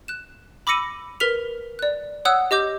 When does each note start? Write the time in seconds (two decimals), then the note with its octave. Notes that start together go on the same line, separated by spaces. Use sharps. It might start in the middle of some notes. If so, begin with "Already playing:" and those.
0.08 F#6 E7
0.67 B5 D6 E6 A#6 C#7 D#7
1.20 A#4 B4 F6 B6 F7
1.79 D5 F#6
2.25 C#5 F#5 D#6 E6 F#6
2.51 G4 D#5 D6 G6